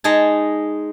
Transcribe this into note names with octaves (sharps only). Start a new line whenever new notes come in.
G#3 D#4 G#5 A5